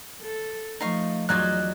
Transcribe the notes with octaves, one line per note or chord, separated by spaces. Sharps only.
A4
F3 A3 D#4 F5 C#6
E2 F#3 D#4 F4 D5 D#5 F#6